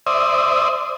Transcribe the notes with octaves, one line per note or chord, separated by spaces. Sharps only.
C5 D5 E5 D#6